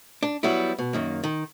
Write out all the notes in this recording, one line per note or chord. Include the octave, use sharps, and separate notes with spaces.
D4
F#3 G3 B3 E4
B2
F#2 D#3 A#3
D#3